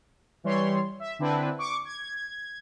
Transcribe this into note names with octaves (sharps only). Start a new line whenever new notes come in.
E3 G3 C#5 C6
E5
D3 C4 D4 E4 B4
C#6 D6
G#6